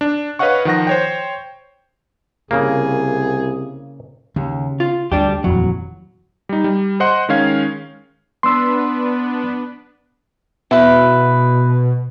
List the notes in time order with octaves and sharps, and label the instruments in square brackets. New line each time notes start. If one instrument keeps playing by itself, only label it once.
[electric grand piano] D4
B4 C#5 D#5 F5 F#5 C#6
D#3 F3 F#5 A#6
C5 C#5 G5
[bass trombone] C2 [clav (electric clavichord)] C#3 A#3 [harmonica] G#4
[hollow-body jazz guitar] D#2 [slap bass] C#3
[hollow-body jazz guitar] F4
[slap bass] D2 [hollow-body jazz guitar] G3 D4 G4
[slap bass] D#1 F2 E3 [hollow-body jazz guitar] F#3
[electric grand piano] G3 D#4
G3
C5 D#5 F#5 C6
D#3 G#3 C#4 F5 G#6
[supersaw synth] B3 D4 B4 [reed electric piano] C6 E6
[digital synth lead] B2 [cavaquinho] E4 B4